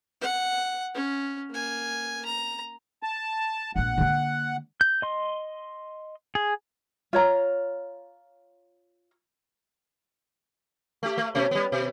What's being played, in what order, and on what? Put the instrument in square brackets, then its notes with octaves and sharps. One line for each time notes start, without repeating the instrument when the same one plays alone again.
[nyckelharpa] F#5
C#4
A#3 G#5
A#5
[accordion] A5
[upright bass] A#1 A#2 [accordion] F#5
[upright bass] D3 A#3
[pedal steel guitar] G6
D#5 C6
G#4
[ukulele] F4 C#5 A#5
[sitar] A3 G4
A3
B2 A3 C#4
G3 B3
B2